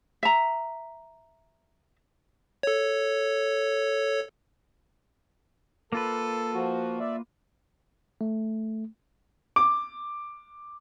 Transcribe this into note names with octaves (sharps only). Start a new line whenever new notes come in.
E5 A#5
A4 C#5
A#3 F4 A4 B4
F3 F#4
D5 E5
A3
D6